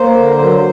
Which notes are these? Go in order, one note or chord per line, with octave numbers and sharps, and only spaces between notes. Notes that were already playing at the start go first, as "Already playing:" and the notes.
Already playing: A#3 C5
D3
F#3